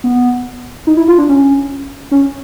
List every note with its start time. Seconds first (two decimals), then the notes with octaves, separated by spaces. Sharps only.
0.04 B3
0.87 D#4
0.97 E4
1.08 F4
1.18 D4
1.29 C#4
2.11 C#4